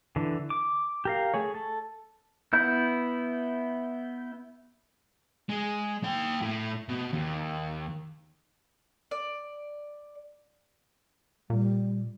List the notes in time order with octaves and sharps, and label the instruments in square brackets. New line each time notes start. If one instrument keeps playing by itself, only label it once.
[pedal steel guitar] D3 E3
D6
G4 A#4 F5
A3 G#4 C#5
A4
B3 E4 G6
[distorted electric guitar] G#3
A#3 G5
A2
B2
D#2
[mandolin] D5
[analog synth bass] A#2 [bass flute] G3